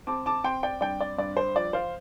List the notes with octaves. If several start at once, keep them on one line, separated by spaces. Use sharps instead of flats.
C4 A5 D6
A5 D6
C4 G5 C6
D5 G5
G2 D5 G5
D5
G2 D5
C5
F3 D5
C5 F5